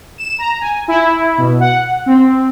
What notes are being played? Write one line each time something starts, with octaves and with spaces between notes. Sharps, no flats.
E7
A#5
G#5
E4
B2
F#5
C4